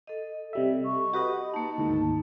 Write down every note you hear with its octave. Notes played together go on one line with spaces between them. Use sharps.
A4 D#5
C3 G3 E5
C#6
F#4 G4 B4 D#5 F#5
A#3 D#4 A5
D2 G#2 D#3